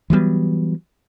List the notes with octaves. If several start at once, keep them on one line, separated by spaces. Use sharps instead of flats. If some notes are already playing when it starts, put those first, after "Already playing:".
E3 F#3 G3 B3